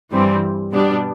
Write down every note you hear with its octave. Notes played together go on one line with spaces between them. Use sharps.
G2 E3 G3 C4
B2 G3 B3 D4